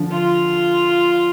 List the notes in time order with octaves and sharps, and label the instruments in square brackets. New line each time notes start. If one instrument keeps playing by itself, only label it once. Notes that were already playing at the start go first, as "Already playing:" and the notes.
Already playing: [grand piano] D3 F3
[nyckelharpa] F4